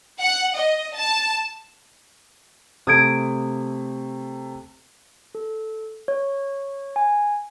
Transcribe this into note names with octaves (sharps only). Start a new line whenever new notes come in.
F#5
D#5
A5
C3 A3 D#6 G#6 D7
A4
C#5
G#5